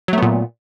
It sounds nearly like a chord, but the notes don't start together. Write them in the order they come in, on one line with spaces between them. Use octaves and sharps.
F#3 A3 B3 A#2